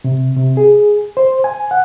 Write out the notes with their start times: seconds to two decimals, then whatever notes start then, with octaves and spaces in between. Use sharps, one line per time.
0.04 C3
0.36 C3
0.57 G#4
1.17 C5
1.44 G#5
1.71 F#5